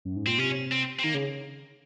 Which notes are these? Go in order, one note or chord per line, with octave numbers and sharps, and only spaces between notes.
F#2
G#2
A#2 C4
C3 C#4
C4
C4
D#3 A#3
C#3